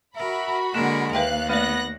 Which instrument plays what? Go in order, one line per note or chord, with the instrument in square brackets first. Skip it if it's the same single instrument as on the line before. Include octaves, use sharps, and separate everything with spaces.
[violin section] F#4 B5 [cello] A#4 [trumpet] E5
[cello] D3 A#4 [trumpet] G#3 [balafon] A#3
[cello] D#2 [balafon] B4 E5 G5 [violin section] F5 F#6
[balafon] A3 D5 [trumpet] B3 [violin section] F#6 A#6